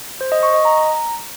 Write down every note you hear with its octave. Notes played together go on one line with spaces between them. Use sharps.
C5
D#5
C#6
D#5
A#5